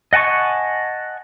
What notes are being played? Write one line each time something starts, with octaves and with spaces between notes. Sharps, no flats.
D#5 F#5 G#5 A5 C#6